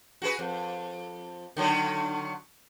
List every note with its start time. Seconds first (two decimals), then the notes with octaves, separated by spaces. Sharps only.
0.22 F#4 G#4 B4
0.39 F2
1.57 D3 D#3 F#3